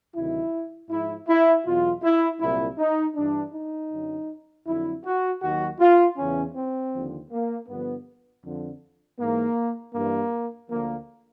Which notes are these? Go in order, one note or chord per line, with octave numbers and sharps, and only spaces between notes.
D2 C3 D#3 F#3 E4
G#2 F3 E4
E4
E2 B2 F#3 F4
E4
C2 A#2 F#3 E4
D#4
G2 E3 D4
D#4
F#2 D3 F#3
F2 D3 F#3 E4
F#4
D#2 D#3 F#3 F#4
F4
E2 C#3 E3 C#4
C4
D#2 D3 F3
A#3
G2 D3 F3 B3
F2 D3 F3
G#2 E3 A#3
G2 E3 A#3
D2 D3 F3 A#3